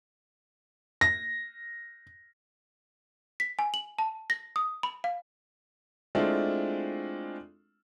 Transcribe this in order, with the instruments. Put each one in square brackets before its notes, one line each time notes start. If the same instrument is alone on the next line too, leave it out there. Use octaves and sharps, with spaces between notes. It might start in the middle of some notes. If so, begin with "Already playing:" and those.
[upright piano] A#6
[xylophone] B6
G#5
F#7
A5
A#6
D#6
B5
F5
[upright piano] G#3 A3 C4 D4 E4 F4